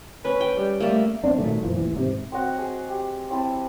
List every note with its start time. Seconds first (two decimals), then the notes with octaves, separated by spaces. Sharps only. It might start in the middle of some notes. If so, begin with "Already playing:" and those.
0.25 C#4 B4
0.41 G5
0.57 G3
0.80 G3 A3 A#3
1.24 B3 C4 D4
1.38 A#2 D#3 F#3 A3
1.63 F#2 A#2 E3 F3
1.77 A1 D#2 E3
1.94 G#2 C3
2.32 C4 F#4 D#5 F#5
2.59 G#4 G5
2.90 G4
3.30 C4 E4 G5 A5